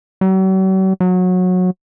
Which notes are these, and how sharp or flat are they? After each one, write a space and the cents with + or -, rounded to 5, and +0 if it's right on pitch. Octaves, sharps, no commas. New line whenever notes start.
F#3 +45
F#3 -20